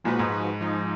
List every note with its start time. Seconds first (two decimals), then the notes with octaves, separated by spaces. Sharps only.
0.04 A#2 F3 G#3 D#4 F#4 B4
0.19 G#2
0.61 F3 G#3 D#4